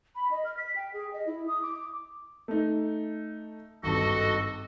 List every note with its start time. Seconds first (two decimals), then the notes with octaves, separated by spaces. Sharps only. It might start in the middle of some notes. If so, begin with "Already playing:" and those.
0.15 B5
0.31 D#5
0.45 F6
0.57 B6
0.76 G5
0.93 G#4
1.13 D#5
1.26 E4
1.47 D#6
1.62 D6
2.48 A3 D#4
3.83 G#1 G2 F#4 A4 D#5